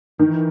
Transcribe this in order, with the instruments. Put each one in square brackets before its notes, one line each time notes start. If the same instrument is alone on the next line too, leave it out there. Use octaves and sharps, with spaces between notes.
[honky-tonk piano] D#3 [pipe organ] E3